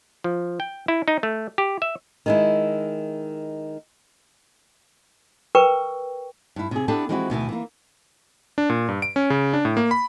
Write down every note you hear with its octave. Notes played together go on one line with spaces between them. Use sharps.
F3
G5
E4
D#4
A3
G4
E5
D#3 G#3 E4
A#4 B4 G5 C#6
G2 E4
C3 G#4
B3 D4 E4 G4 A4
E3 F3 G#3 C4 E4 F#4
D2 B2 D#3 E3
E3 A#3
D4
A#2
G2
D7
C#4
C#3
D4
A2
A#3
B5